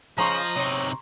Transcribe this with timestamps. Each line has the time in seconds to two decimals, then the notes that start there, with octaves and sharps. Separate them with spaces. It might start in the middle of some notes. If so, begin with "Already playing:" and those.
0.18 C#3 F3 D#5 A#5 C6 C#6
0.56 C3 D#4 C#5